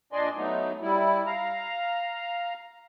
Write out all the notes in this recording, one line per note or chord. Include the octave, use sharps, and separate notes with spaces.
A#2 D4 D5 D#5 G#5 C6
F#3 A3 B3 D#4
G3 E4
F5 A#5